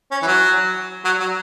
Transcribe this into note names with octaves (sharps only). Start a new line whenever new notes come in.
C#4
E3
F#3
F#3
F#3